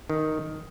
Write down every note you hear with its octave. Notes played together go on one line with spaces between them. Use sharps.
D#3